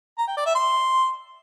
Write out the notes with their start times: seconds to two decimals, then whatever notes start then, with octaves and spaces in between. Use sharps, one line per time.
0.19 A#5
0.28 G5
0.37 D5
0.46 E5
0.55 C6